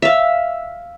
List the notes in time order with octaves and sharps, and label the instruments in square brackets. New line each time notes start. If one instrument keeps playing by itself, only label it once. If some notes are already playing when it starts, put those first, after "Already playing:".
[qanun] E5 F5